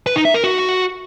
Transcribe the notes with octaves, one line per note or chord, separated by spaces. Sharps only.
B4
D#4
E5
A#4
F#4